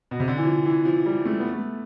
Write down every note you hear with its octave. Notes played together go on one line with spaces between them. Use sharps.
B2
C3
D3
E3
F3
E3
F3
G3
A3
B3
A3